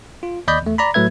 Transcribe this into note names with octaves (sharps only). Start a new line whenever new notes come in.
F4
D#2 D5 D#5 B5 G6
E2 A3
D5 A#5 B5
A2 F#3 A3 B4 E5 G#6